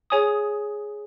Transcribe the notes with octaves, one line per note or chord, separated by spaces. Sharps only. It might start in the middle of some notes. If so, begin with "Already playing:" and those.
G#4 C#5 G#5 D#6